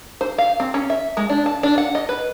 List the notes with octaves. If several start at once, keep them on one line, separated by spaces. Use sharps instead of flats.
C5
F5
C4
C#4
E5
G#3
D4
A5
D4
F#5
D#5
B4